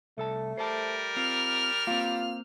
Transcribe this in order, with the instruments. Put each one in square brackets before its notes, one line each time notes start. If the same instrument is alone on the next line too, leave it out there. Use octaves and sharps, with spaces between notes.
[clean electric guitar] C2 A4 A5 [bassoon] A3
[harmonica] G3 A#4 [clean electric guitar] C5 A5
[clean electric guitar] C4 F4 [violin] F6
[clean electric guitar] A#3 C4 [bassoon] F4